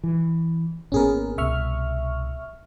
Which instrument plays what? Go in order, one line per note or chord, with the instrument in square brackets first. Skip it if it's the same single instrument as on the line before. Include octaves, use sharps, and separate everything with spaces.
[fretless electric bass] E3
[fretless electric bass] G#1 A#2 B3 [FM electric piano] C#4 G#4 A#4
[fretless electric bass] C2 B2 [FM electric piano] E5 C#6 F6